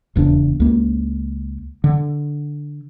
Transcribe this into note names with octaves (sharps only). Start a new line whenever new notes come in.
D#1 E2 C#3 D4
C#2 A#3
D3